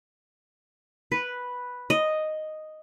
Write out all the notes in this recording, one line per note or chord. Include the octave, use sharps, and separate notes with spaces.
B4
D#5